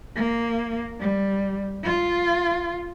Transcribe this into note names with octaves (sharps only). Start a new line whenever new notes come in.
A#3
G3
F4